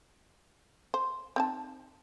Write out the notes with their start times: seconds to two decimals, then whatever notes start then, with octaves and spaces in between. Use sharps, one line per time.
0.94 C5
1.36 C4 D#4 A5